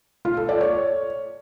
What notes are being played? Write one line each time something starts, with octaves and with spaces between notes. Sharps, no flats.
F4
A4
D5
C#5